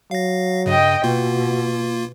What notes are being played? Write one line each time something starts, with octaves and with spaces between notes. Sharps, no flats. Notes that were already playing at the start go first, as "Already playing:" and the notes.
F#3 F5 A#6
G2 C#3 D#5 G5
B2 A#3 F4 F#4